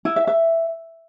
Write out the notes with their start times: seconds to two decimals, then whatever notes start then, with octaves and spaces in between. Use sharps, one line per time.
0.05 E4
0.16 E5
0.27 E5